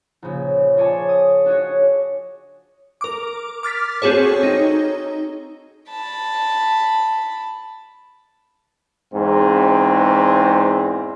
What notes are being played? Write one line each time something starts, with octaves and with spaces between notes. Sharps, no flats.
A#1 C#3
F4 G#4 C#5 D5 G#5 A5
D#6
D4 F#4 G#4 C#5 D#5
A#4 D6
D6 F6 A6 B6
C4 F#4 G#4 A4 C#5
D#4
A5 B5
E2 G#2 C4